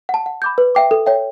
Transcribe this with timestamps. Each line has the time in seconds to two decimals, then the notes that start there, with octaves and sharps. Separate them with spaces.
0.09 F#5 A5
0.26 F#5
0.42 B5 D6 G6
0.58 B4
0.75 E5 G5 D6
0.91 A4
1.06 C#5 E5 G5